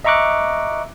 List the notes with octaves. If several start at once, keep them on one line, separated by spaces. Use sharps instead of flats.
D#5 E5 A#5 C#6 D6 F#6